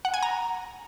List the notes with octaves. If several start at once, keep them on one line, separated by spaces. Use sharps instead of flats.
F#5
G#5
A#5